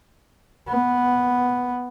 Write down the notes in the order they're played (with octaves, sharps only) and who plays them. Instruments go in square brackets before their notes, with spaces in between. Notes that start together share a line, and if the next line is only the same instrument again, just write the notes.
[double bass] B3